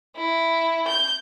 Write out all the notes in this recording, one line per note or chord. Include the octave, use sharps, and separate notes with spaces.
E4
G6